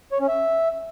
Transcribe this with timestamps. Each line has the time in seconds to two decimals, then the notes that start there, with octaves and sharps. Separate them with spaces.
0.12 C#5
0.20 C#4
0.28 E5